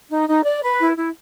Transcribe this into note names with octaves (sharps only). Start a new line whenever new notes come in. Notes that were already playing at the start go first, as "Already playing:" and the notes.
D#4
D#4
D5
B4
E4
E4